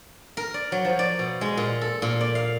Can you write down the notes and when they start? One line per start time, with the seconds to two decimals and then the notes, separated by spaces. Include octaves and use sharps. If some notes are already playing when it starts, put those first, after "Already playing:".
0.37 A#4
0.54 D5
0.72 F#3
0.85 F3
0.99 D5
1.19 B2
1.41 G#3
1.57 A#2
1.81 A4
2.02 A#2
2.21 D5
2.35 F5